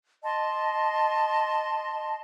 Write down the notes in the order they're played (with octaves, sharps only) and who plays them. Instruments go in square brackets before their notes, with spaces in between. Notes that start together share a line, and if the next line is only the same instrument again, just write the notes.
[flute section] D#5 A5 C6